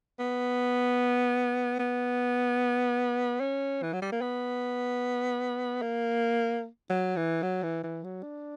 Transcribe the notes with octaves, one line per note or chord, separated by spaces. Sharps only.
B3
B3
C#4
E3
F#3
G3
A#3
B3
A#3
F#3
E3
F#3
E3
E3
F#3
D4